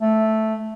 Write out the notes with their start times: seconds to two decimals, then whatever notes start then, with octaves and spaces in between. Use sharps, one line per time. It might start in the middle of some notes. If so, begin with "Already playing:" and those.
0.02 A3